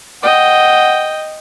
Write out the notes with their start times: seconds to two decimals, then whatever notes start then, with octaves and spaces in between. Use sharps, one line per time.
0.23 D#5 F#5 G5